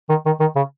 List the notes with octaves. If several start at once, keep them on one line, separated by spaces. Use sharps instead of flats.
D#3
D#3
D#3
C#3